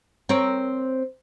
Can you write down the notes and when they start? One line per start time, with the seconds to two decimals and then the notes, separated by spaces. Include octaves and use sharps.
0.29 C4 A#4 C#5